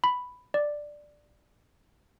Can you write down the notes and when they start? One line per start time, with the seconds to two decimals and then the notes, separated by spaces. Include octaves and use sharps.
0.04 B5
0.54 D5